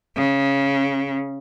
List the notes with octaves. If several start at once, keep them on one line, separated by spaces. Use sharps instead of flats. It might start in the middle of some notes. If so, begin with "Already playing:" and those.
C#3